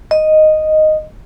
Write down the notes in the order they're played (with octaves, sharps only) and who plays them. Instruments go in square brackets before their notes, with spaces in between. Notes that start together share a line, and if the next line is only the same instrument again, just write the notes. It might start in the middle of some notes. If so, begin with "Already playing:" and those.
[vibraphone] D#5